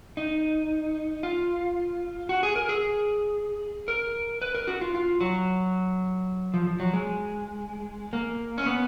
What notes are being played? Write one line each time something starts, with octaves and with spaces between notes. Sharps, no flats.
D#4
F4
F#4
G#4
A#4
G#4
A#4
B4
A#4
F#4
F4
F4
F#3
F3
F3
F#3
G#3
A#3
C#4
B3